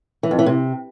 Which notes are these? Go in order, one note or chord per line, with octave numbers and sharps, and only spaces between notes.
E3
F2
E3
C3